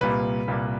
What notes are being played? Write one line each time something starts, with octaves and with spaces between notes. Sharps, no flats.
C2 A#2 G3 A#3 B4
C2 A#2 G3 A#3